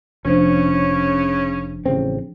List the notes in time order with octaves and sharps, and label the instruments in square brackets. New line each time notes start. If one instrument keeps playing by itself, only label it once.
[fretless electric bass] F1 [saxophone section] C#3 C#4 [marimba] F3 D4 C5
[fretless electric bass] A1 C#3 C4